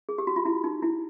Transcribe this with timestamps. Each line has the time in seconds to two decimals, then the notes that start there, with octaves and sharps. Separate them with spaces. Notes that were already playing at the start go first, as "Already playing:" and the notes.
0.09 G#4
0.18 G4
0.27 F#4
0.36 F4
0.45 E4
0.64 D#4
0.82 E4